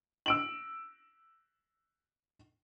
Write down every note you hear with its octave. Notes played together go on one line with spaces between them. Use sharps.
E6 D7 F#7